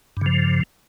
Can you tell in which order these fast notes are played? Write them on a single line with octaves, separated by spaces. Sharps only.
G2 C#3 F3